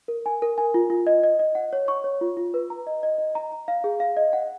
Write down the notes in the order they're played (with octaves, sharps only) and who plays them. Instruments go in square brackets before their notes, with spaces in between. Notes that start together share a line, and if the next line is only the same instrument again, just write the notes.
[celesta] A#4
G#5
A#4
G#5
F4
F4
D#5
D#5
D#5
F#5
C#5
C#6
C#5
F4
F4
B4
A#5
D#5
D#5
D#5
A#5
A#5
F5
G#4
F5
D#5
F#5